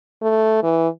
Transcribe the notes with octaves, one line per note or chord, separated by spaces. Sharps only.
A3
E3